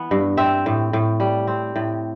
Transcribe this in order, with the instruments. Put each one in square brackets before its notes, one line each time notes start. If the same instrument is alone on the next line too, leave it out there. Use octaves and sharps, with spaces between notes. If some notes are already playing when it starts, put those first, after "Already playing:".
Already playing: [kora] E3 B3
G2
C4 E5
A2
A2
G3
C4
A2